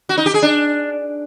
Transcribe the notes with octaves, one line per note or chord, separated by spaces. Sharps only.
F#4
D#4
G4
G#4
D4